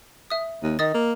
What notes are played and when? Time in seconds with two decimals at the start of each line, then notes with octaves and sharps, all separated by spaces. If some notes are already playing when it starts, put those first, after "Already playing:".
0.30 E5 D#6
0.63 D#2
0.79 D#3 D#5 D#6 A6
0.94 A#3